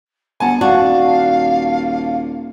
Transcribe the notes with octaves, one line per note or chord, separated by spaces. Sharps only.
G1 F#5 G#5 A5
D#1 F#4 D5 F5 A5